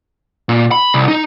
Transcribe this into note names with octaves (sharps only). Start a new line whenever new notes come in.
A#2
B5
C2
D#4